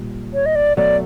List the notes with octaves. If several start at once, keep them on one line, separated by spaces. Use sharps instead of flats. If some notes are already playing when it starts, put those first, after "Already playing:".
Already playing: A#2 G3
C#5
D#5
D5
B2 F#3 A3 D5